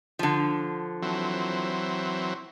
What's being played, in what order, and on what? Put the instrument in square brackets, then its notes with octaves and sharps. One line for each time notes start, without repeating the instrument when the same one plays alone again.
[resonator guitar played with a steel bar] D3 F3
[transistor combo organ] E3 F#3 C4